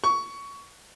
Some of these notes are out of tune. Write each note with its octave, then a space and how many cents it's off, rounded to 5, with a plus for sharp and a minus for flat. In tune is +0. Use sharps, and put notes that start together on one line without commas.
C#6 +15